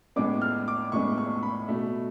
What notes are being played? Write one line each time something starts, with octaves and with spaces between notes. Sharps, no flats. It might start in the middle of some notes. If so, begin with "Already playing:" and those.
A2 G#3 B3 D6
F6
D6
A2 G#3 B3 C#6
C#6
B5
B2 A3